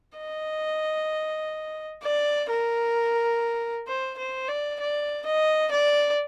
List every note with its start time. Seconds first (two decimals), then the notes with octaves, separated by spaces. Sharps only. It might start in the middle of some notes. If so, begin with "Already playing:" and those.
0.18 D#5
2.02 D5
2.49 A#4
3.87 C5
4.18 C5
4.48 D5
4.80 D5
5.26 D#5
5.71 D5